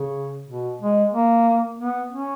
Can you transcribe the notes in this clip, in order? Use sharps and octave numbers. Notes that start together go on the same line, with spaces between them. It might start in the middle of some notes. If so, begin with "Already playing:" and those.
Already playing: C#3
B2
G#3
A#3
B3
C#4